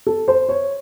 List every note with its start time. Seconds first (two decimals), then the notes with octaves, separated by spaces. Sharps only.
0.07 A4
0.28 C5
0.49 C#5